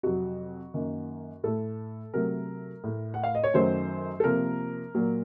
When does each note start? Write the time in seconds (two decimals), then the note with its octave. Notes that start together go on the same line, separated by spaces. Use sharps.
0.03 F2 C3 F#3 F#4
0.74 F#2 D#3 A#3
1.44 A2 A3 A4
2.13 C3 F#3 A3 A#4
2.84 A2 A3
3.14 F#5
3.24 F5
3.35 D#5
3.44 C#5
3.54 F#2 D#3 F#3 A3 C5
4.20 A4
4.24 C3 F3 A#3 A#4
4.94 A#2 F#3 A#3